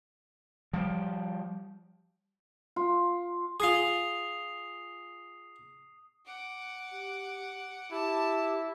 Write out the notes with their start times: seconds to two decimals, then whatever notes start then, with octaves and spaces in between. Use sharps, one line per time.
0.73 F3 G3
2.76 F4
3.60 F4 G#4 D#6 C7 F7
6.26 F#5 D6
6.93 G4
7.92 E4 G4 A5